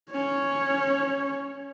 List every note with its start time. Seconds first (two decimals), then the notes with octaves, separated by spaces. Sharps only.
0.11 C#4 C#5